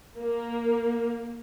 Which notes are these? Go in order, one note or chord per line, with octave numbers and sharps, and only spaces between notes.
A#3